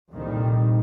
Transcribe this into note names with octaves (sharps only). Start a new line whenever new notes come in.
C2 F2 A#2 D#3 G3